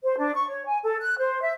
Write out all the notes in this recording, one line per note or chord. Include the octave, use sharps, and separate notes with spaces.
C5
D4
C#6
C#5
G#5
A4
F#6
C5
E5